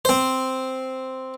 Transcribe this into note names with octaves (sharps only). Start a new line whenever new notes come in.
C4 C5